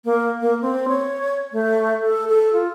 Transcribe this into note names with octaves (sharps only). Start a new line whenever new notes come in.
A#3
A#3
C4
C#5
A3
A4
A4
F4